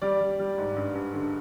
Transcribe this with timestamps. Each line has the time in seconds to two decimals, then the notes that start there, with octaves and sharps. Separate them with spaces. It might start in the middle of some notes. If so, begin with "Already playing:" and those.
0.02 G3 D5
0.21 G3
0.39 G3
0.58 G#2
0.76 G2
0.95 G2
1.14 D3